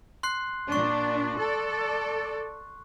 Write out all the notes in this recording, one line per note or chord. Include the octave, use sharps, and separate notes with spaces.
C6 F#6 C7
A#2 D4 C#6
A4 D5